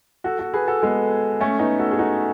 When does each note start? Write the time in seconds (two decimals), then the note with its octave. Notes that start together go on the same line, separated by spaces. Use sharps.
0.24 F#4 A4
0.39 F#4 A4
0.54 G#4 B4
0.68 F#4 A4
0.83 G#3 B3
1.41 A3 C#4
1.59 B3 D#4
1.79 F#4 A4
1.91 G#4
1.99 D#4 F#4